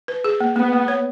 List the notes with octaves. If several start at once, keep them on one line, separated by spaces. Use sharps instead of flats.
B4
G#4
A#3
A#3 B3
A#3
C#5